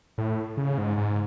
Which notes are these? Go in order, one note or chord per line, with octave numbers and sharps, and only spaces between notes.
A2
C#3
G#2
G#2